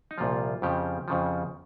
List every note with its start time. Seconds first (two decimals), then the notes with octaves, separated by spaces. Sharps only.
0.11 D#4
0.18 C2 A#2 F3 F4
0.62 F2 C#3 F3 G4
1.08 F2 C#3 F3